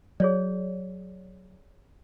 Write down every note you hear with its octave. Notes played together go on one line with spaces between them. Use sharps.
F#3 G#4 C#5 D5